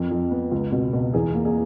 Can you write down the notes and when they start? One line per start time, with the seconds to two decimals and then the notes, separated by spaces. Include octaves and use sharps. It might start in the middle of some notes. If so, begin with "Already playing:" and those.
Already playing: F2 A#4
0.11 F2
0.31 B3
0.51 C#2
0.72 B2
0.93 B2
1.14 E2 G#4
1.34 A#3
1.45 G#4